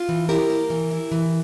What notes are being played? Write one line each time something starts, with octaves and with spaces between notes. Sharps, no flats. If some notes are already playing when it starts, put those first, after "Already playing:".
Already playing: F4
E3
E4 G4 A#4
A#3
E3
E4
E3